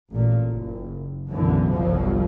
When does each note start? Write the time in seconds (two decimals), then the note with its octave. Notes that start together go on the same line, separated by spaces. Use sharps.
0.11 A1 A#2
0.48 F#1
1.30 B1 F#2 B2 D3 E3
1.73 G1 C2 F2 B2 F3 F#3